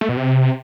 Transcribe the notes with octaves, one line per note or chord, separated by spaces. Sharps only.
A3
B2
C3